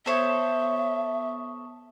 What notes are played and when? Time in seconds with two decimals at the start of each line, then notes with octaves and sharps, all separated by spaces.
0.06 B3 A4 C5 C#5 E5 C#6 D#6